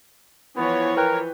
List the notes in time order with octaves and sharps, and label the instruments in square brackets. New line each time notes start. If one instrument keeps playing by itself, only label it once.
[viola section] E3 F3 C#5 [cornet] B3
[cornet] A#4 [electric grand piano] B4 G5 F#6